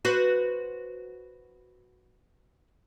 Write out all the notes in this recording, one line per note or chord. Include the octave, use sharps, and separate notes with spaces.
F#4 B4 C5